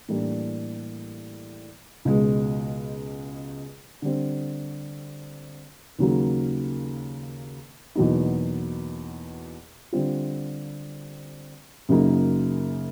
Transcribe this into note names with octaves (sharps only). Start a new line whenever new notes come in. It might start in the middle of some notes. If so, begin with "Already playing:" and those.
A2 E3 G3 A#3 D4
C#2 B2 G#3
D3 G3 C4
D#2 C#3 F#3 A#3
E2 B2 F#3 A#3 D#4
D3 G3 C4 F4
F#2 C#3 F#3 A#3 D#4